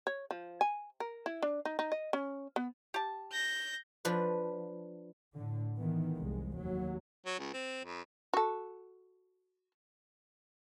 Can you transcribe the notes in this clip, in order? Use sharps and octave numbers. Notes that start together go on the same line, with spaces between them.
C#5
F3
G#5
A#4
E4
D4
D#4
D#4
D#5
C#4
B3
G4 A5
G6 A#6
F3 D4 B4
A2 D3
D#3 E3 B3
F1 C2 G#3
D#2 F#3
F#3
C#2
C4
F2
F#4 A4